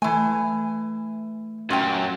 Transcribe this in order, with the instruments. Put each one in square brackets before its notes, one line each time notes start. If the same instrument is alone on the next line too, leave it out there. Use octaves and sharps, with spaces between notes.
[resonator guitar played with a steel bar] E3 G#5 [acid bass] A3
[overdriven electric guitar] F#2 [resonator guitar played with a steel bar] A#2 G5